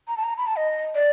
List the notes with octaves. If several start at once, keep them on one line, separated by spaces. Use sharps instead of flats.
A#5
A5
A#5
B5
A5
D#5
D5